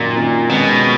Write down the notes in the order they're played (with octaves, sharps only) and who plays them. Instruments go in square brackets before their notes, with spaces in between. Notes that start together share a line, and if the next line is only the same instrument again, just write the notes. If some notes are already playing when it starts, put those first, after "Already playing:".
Already playing: [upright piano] F#2 D#3 F#3 [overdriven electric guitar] A#2
[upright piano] F#2 D#3 F#3
[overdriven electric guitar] B2 [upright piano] D#3 G#3 C#4